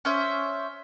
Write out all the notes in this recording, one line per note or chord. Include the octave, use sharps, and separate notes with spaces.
C#4 C5 E5